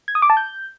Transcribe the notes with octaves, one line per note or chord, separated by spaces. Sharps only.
G#6
D#6
D6
A5
G6